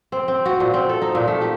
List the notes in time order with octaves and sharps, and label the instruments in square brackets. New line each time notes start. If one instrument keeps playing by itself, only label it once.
[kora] C4
C4
F#4
A#2
C4
A4
D#4
A#2
A3
G4